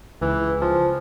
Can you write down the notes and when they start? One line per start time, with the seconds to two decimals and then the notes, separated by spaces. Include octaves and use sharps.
0.21 C#2 E3
0.61 F3